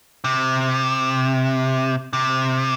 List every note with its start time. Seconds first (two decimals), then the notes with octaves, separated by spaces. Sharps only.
0.24 C3
2.13 C3